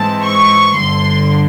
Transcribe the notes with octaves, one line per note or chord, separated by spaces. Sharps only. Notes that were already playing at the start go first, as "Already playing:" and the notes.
Already playing: G#2 E3 G#3 C4 A5
C#6
G1 G2 D3 C6